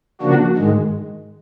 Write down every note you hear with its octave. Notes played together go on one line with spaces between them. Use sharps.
C#3 F3 A#3 D4 F#4
G#2 D#3 G#3